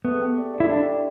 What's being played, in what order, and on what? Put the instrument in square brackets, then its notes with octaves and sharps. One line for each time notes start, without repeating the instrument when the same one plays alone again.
[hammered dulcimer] A3 [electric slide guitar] B3
[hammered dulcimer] G4
D5
D3
[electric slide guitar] E4
[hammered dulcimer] G3 [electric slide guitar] D4
[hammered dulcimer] E4